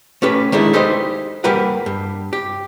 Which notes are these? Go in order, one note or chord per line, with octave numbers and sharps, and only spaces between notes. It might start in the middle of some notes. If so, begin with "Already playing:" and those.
A3 C#4 G4 B4
D#3 G#3 A3 D4 E4
D#4 G4 A4 B4 C5 D#5
G3 A#3 G4 A#4 B4 F#5
G2
G4